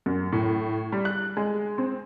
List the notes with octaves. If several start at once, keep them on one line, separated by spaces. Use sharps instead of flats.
F#2
A2
G3
F#6
G#3
C4